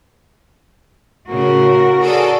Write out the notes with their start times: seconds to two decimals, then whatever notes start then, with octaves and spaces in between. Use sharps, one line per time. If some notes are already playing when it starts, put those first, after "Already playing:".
1.30 A2 C#3 F#4 A#4
2.01 G#4 A4 D5